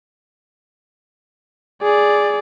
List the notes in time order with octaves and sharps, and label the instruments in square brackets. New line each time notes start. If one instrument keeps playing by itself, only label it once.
[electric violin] G#4 D5